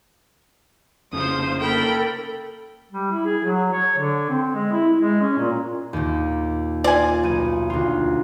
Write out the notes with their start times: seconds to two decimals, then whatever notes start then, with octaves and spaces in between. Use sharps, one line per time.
1.13 F1 C#3 F3 C5 D#6
1.60 A#3 A4 A#4 G5 B5
2.91 G3
3.11 E4
3.26 G#4
3.44 F#3
3.73 C#5
3.97 D3
4.30 C4
4.55 G#3
4.72 E4
4.99 G#3
5.21 C#4
5.37 A#2
5.93 D#2 A#2
6.84 F4 D5 G#5
7.23 B1 D#7
7.70 D2 F4